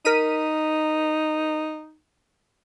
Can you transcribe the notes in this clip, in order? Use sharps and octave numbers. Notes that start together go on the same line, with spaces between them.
D#4 A#4 B6 D#7